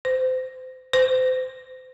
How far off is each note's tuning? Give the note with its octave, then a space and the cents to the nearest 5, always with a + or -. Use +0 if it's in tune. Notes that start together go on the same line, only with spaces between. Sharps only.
C5 -25
C5 -30